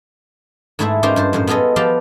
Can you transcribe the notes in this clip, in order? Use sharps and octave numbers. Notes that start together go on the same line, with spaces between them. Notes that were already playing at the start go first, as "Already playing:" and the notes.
G#2 A3 E4 G#4 E5 A5
C#4 D#4 F4 G4 A#4 C5
G2 C5 A5
F#2 A2 C5
B3 F4 G#4 A4 D#5
F3 G4 B4 F5 G5 A5